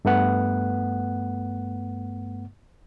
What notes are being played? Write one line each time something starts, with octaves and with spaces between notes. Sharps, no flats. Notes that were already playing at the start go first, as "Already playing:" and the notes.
G2 A3 B3 F#5